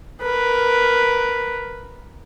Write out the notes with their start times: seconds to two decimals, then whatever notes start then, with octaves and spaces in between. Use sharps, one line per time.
0.22 A#4 B4